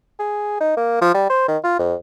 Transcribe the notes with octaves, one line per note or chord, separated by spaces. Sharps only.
G#4
D#4
A#3
F3
G3
C5
D#3
F4
F2